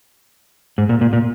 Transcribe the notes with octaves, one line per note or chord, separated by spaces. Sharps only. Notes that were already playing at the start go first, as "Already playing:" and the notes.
G#2
A#2
A#2
A#2